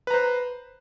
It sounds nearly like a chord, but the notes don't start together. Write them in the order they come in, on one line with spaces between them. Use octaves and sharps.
B4 A#5 C5